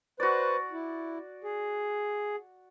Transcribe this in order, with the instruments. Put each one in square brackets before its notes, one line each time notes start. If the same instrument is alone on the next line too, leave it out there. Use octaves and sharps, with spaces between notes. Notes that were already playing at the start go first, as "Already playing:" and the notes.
[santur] F#4 D5 [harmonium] B4 C5
[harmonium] E4
G#4